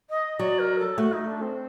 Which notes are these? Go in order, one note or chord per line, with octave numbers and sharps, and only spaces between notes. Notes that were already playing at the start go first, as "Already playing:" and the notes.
D#5
F#3 D5
A#4
A4
A3 F#4
D#4
D4
C4